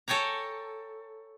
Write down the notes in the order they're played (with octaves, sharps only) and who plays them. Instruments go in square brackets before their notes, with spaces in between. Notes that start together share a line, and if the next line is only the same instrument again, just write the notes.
[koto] A4 C#5 G5 G#5 A#5